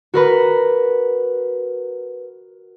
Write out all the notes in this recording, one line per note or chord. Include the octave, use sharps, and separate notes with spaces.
F#4 A#4 B4